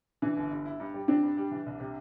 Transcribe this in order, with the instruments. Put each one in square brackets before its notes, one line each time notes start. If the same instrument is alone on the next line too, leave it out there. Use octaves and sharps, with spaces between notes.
[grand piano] E3 [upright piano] D4
[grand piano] G1
G2
E4
G2
G3
[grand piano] C4 [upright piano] D4
[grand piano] G2
G3
E3
C2
C3